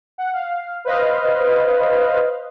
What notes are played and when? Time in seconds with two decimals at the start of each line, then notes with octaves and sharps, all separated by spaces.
0.18 F#5
0.33 F5
0.85 B4 C5 D#5 F5